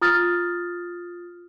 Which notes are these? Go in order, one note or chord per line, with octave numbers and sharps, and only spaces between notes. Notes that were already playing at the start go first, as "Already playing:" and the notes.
F4 D#6 F6 A6